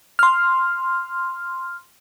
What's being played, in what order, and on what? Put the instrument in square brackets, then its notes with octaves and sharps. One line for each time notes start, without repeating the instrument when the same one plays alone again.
[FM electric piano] C6 F6